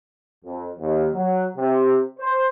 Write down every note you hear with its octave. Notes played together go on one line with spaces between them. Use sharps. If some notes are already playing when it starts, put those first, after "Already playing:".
F2
D#2
F#3
C3
C5